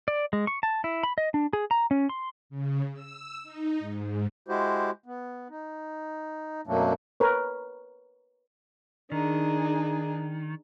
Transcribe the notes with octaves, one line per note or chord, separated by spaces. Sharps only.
D5
G#3
C#6
A5
E4
B5
D#5
D4
G#4
A#5
C#4
C6
C#3
E6
D#4
G#2
G#3 E4 F#4 G4 C5
B3
D#4
F#2 B2 F#3 A3 A#3 D4
A#4 B4 C#5
D#3 D4 D#4 G#4